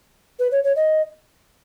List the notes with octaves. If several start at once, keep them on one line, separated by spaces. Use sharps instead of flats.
B4
C#5
C#5
D#5